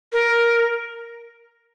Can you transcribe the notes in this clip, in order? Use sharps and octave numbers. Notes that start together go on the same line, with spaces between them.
A#4